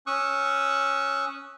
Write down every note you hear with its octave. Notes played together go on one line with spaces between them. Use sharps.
C#4 C#6 D#6 E6 F#6